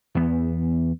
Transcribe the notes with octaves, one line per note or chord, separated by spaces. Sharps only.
E2 B3